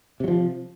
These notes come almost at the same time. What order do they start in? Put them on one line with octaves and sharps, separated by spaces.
C3 F#3 F3